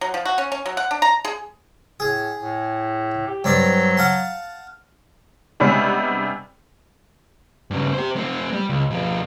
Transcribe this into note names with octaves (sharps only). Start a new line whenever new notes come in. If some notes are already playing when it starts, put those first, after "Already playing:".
F#3
F3
F#4
C#4
C#4
F#3
F#5
D4
A#5
G#4
A2 G#4
A2
G4
G2 F#3 C4 D5
F5 F#5 A5
C3 G3 G#3 B3 C#4 D4
G2 C#3
G4 C5
A3 C4
G3
C#2
B2 F3